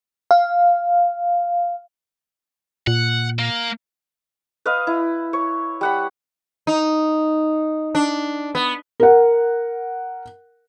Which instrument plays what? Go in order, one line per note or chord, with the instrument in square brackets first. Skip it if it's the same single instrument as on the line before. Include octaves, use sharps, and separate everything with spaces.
[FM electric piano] F5
[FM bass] A#2 [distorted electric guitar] F#5
[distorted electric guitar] A#3
[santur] B4 D#5 F5
E4
C#5
G3 F#5 B5
[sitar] D#4
D4
B3
[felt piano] A#4 F#5